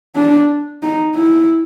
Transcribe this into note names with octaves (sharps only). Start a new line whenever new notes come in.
D4
D#4
E4